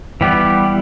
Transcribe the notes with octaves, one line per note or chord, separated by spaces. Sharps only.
E3 G3 B3 G4